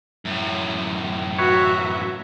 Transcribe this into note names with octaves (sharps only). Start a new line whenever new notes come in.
F#2 A2
F#4 B4 C#5 E5